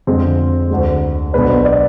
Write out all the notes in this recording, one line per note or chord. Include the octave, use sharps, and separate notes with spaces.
F2 D3 G#3 C4
D2 D3 G#3
B1 B2 G#3 D4 B4
C5
D5